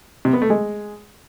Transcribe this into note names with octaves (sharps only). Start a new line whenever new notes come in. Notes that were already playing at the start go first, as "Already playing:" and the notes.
C3
B3
A3
G#3